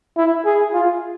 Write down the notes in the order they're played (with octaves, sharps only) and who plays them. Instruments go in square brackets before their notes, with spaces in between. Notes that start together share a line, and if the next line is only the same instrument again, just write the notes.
[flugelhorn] E4
G#4
F4